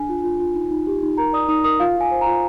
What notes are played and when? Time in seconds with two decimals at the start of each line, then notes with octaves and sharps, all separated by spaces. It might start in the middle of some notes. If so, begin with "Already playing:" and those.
Already playing: D4 G#4 G#5
0.09 F4
0.24 F4
0.40 F4
0.55 D#4
0.71 D#4
0.87 G4
1.03 D#4
1.18 A#4 A#5
1.33 D5 D#6
1.48 D#4 D#6
1.64 A#4 D#6
1.80 F4 F5
1.96 F4 G#5
2.11 C5
2.21 A#5
2.27 F4